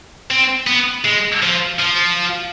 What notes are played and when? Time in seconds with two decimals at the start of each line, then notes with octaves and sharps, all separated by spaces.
0.31 C4
0.67 B3
1.05 G#3
1.42 F3
1.79 F3